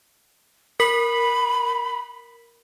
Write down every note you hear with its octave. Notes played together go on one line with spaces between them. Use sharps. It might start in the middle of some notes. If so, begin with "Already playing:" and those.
A#4 B5 B6 F#7